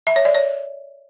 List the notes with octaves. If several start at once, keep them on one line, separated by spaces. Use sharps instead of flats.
E5
C#5
D5
C#5